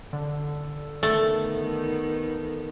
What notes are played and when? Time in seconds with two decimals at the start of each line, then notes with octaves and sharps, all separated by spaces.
0.13 D3 A4
1.03 D#3 A3 B3